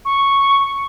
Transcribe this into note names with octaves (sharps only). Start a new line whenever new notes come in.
C#6